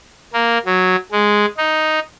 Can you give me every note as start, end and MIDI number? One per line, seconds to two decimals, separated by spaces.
0.33 0.58 58
0.66 0.96 54
1.11 1.45 56
1.57 1.99 63